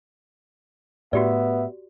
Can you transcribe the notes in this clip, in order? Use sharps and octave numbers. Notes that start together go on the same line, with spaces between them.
A2 B3 F#4 G4 D5 E5